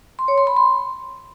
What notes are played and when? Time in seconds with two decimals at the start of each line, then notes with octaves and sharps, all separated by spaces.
0.19 C6
0.28 C#5
0.38 C6
0.47 B5
0.57 C6